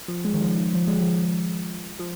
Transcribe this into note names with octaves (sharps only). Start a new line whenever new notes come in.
F3
G#3
D#3
F3
D#3
F3
G#3
F3
F3